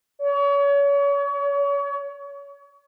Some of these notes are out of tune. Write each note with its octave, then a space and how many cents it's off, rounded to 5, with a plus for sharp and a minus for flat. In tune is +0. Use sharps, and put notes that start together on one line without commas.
C#5 +35